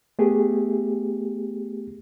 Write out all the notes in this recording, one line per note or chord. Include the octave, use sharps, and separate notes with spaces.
A3 B3 G4 G#4